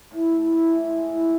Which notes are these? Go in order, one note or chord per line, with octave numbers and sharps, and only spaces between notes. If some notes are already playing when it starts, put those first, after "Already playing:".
A2
A2
A2
E3
G#3
A2